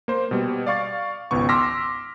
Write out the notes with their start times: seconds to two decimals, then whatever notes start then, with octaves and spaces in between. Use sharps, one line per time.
0.08 A#3 C5
0.31 B2 G3
0.66 D5 F5 C#6 A6
1.31 G#1 C#2 B3 C#6
1.49 C6 D6 E6 F6 A#6 B6